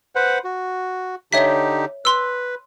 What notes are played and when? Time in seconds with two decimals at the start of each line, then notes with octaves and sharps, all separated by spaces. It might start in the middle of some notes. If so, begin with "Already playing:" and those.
0.16 B4 C5 F#5
0.44 F#4
1.33 D3 D#4 G4 C#5 E5 B6
2.05 B4 C6 E6